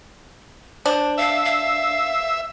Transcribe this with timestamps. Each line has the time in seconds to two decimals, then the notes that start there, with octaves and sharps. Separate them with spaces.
0.86 D4 C5
1.18 E5 F5
1.45 F5